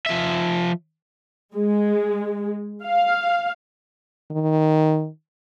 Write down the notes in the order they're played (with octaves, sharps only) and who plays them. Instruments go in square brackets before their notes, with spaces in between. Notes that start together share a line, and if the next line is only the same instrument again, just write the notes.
[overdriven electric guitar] F3 E5
[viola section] G#3
F5
[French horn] D#3